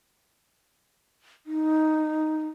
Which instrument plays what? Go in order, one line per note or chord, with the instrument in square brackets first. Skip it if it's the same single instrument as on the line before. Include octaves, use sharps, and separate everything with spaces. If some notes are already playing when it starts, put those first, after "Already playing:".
[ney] D#4